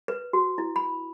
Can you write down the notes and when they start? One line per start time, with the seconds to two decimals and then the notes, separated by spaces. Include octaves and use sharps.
0.08 B4
0.33 F#4
0.58 E4
0.76 B5